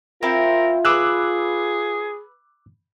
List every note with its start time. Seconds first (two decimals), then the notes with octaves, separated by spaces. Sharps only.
0.23 C4 E4 F4 A#4 C5
0.85 G#4 B4 D6 E6 F#6